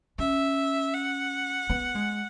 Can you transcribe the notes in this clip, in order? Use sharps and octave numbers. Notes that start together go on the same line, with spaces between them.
C#4 E5
F#5
B3
G#3